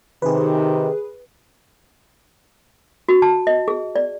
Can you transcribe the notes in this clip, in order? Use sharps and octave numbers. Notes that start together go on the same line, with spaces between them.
C3 D#3 G#4 B4
F#4
A5
D#5
G#4
D5